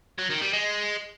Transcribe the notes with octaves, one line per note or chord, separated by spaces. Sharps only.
F#3
D#3
G3
G#3